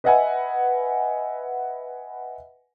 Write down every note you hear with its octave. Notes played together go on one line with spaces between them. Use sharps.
B4 D#5 E5 F#5 G#5